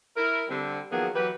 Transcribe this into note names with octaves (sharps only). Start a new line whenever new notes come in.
E4 A#4
D3 G3 C4
D#3 F3 F#3 A#3 B3 G#4
E3 F#3 G4 B4